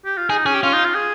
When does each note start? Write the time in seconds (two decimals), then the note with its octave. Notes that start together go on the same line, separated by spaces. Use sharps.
0.05 G4
0.17 F4
0.30 D#4 G#4
0.46 C#4 G#4
0.54 G4
0.63 C#4 F4
0.73 D#4
0.85 F4
0.95 G#4